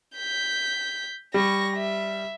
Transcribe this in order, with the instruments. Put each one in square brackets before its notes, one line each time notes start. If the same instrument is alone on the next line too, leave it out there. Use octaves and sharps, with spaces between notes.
[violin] G6 B6
[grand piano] G3 [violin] C#6 A#6
[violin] E5